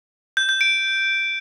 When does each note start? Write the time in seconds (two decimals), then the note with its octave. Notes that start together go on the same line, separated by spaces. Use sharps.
0.37 G6
0.49 G6
0.61 D7